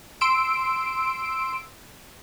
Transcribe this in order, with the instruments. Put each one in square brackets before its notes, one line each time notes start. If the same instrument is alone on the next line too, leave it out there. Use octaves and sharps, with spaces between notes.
[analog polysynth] C6 E6 D7